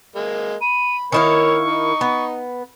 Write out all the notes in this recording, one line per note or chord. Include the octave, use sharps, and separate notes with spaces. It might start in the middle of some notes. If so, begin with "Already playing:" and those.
G#3 A#3
B5 D#7
D#3 A#3 E4 C#5 F5 C#6
D#4
B3